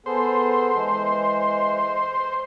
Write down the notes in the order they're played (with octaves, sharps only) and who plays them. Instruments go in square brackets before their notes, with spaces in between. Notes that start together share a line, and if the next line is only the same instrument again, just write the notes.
[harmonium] B3 G#4 A4 [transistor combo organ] C5
[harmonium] E3 G#3